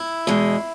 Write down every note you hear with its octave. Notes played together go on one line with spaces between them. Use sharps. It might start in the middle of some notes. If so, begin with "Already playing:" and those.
Already playing: E4
E2 B2 G#3